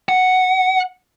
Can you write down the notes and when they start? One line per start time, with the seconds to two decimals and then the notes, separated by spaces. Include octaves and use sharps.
0.09 F#5